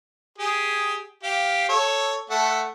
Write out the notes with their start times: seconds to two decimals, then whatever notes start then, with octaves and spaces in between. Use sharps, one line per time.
0.38 G4 G#4
1.23 G4 F5
1.69 A4 C#5
2.30 A3 A4 F#5